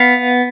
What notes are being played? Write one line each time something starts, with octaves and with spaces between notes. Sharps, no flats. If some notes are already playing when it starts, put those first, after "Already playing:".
Already playing: B3 F5